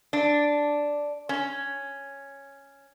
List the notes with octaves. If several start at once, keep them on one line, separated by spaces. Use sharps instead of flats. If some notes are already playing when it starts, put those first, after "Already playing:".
D4
C#4